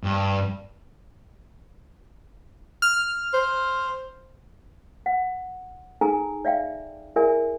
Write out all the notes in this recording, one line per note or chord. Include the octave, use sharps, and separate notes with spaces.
G2
F6
C5
F#5
D#4 G#4 A4 G#5 A#5
D5 E5 F5 G5
E4 G#4 A#4 D5 E5 G#5